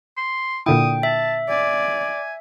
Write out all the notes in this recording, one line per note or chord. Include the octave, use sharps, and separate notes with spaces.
C6
A#2 D3 E4 G5 D#6
E5 A5
D5 G#5